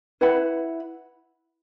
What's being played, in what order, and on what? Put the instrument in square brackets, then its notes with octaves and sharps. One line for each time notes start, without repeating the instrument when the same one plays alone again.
[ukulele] E4 B4 F#5 B5